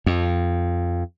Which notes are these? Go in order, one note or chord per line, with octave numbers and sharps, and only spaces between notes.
F2